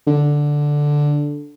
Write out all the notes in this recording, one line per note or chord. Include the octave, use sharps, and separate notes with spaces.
D3